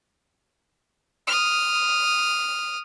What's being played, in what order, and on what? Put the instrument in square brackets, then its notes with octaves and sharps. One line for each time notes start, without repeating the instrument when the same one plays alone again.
[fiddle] D#6 F6